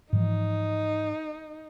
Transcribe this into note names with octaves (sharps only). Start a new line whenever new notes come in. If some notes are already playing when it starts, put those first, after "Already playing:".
G#2 E3 F3 D#4